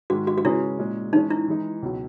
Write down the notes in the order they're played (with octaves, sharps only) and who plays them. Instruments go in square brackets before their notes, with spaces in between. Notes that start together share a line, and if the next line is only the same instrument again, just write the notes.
[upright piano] G#2 D#3 G#3 [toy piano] F#4
[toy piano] F#4
F#4
[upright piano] C#3 G#3 C#4 G#4 B4 [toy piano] E4
[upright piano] A#2 G#3 C#4
[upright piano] E3 G#3 C#4 [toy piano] D#4
[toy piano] E4
[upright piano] E3 G#3 D#4
C#2 B2 F#3